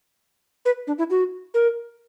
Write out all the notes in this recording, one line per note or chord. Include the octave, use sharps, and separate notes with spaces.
B4
D4
E4
F#4
A#4